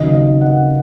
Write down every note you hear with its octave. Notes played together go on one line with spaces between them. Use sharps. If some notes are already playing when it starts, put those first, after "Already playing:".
Already playing: D#2 C#3 F#3 D#5
D#5
F#5